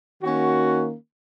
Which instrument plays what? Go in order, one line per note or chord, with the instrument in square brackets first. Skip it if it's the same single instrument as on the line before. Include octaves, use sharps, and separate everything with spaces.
[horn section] D#3 A#3 C#4 F#4